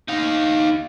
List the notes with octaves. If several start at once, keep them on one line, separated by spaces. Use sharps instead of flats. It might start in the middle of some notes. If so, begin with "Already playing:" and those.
D#4 F5